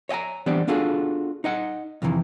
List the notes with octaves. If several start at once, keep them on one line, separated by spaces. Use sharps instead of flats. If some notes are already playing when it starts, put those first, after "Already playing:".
C#5 D#5 G5 G#5 A#5
E3 G3 B3 D4 C5 D5
B3 D4 F4 F#4 G#4 A4
D#4 D#5 F#5
F2 C3 D#3 E3